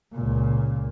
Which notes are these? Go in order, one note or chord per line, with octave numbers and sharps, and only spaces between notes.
C#2 A#2